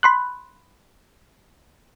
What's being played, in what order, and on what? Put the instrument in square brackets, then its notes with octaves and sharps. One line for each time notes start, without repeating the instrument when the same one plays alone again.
[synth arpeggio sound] B5 C6 F#6